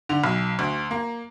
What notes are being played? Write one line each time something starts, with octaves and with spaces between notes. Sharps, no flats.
D3
B1
D2
A#3